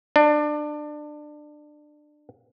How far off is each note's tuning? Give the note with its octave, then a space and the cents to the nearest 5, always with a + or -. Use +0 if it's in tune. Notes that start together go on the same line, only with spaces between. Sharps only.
D4 +25